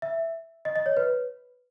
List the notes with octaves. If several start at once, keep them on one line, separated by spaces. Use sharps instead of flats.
E5
D#5
D#5
C#5
B4